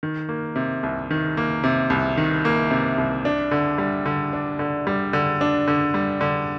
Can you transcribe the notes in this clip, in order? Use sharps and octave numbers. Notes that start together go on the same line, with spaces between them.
D#3
A#3
C3
C2
D#3
A#3
C3
C2
D#3
A#3
C3
C2
D4
D3
G3
D3
D4
D3
G3
D3
D4
D3
G3
D3